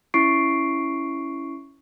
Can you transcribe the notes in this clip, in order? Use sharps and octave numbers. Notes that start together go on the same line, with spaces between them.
C#4 E4 C#6 C7 D7